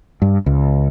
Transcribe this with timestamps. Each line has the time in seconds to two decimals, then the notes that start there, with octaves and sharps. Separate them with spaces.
0.22 G2
0.46 C#2